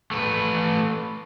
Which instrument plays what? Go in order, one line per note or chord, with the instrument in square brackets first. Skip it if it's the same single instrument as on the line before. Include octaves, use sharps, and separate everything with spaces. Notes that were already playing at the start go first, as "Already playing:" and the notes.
[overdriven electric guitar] A3 B4